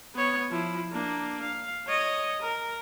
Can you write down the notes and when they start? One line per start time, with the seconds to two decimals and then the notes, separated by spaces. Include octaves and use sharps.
0.15 B3 C#5
0.50 F3 E4
0.92 A#3 D4
1.43 F5
1.87 C#5 D#5
2.42 A#4